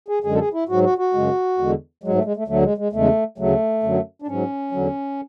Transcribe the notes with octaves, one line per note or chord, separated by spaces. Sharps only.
G#4
F#2 D3 G#3 G#4
A4
G#4
E4
G#2 F#3 F#4
F#4
F#4
F#2 C#3 G#3
E2 D3 G#3
G#2 F#3 G#3
A3
G#3
A3
D2 D3 F#3 A3
G#3
G#3
E2 C#3 G#3 A3
D2 C#3 F#3 A3
F#2 D3 F#3
D4
G#2 F#3 C#4
E2 D3 F#3